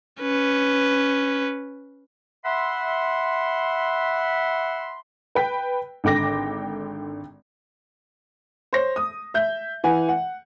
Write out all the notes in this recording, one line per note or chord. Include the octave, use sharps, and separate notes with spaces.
C#4 B4
E5 F#5 B5 C6
B4 G5 B6
G#1 D3 G5 D6 A#6
C5 C#5 A#6
D#6
E5 G6
E3 F#5 G#5
F#5